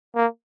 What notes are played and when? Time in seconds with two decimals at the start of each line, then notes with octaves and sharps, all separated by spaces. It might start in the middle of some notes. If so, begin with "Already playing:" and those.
0.16 A#3